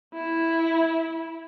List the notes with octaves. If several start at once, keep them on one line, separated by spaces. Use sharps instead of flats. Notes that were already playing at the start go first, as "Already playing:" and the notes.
E4